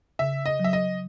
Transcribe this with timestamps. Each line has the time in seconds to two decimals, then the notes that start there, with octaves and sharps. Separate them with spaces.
0.19 C#3 E5
0.46 D#5
0.60 F#3 E5
0.73 D#5